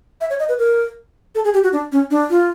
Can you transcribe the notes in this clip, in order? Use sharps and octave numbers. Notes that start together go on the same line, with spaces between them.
E5
C#5
D#5
B4
A#4
A4
G#4
G4
F#4
D4
C#4
D4
F4